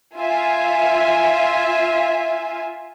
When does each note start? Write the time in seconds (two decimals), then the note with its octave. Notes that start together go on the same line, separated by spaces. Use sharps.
0.17 F4 E5 G#5